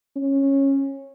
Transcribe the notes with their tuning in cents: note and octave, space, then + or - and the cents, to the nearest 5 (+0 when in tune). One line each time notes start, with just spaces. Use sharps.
C#4 -15